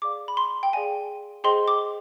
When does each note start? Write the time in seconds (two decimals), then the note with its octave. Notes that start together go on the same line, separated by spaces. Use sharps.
0.02 G#4 D5 F5 D6
0.28 B5
0.37 C6
0.63 G5
0.73 G#4 D5 F5 G#5
1.44 G#4 C5 D#5 G5 C6
1.68 D6